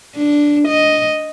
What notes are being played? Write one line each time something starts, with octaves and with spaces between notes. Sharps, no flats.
D4
D#5